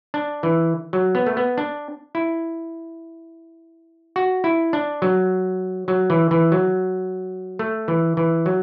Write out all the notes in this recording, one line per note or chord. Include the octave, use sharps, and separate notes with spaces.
D4
E3
F#3
B3
A3
B3
D4
E4
F#4
E4
D4
F#3
F#3
E3
E3
F#3
A3
E3
E3
F#3